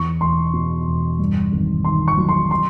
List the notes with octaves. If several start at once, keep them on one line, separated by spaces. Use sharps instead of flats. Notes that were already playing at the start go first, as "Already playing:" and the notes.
Already playing: E2 C#6
E1 C6
B2
E1
G2
G#1
D#3 C6
C#6
F#3
C6
C6